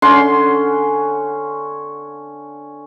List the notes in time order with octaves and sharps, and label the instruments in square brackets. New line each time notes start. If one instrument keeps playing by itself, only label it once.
[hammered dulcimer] D3 C#4 F#5 C6